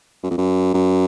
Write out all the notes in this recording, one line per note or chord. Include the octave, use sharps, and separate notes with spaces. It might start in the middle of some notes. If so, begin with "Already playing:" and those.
F#2
F2
F#2
F#2